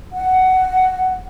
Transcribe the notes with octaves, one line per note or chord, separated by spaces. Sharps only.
F#5